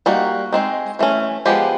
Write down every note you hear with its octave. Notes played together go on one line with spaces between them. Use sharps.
G3 A#3 D#4 F#4
G#3 C4 D#4
E3 A3 C#4
F3 G#3 B3 G4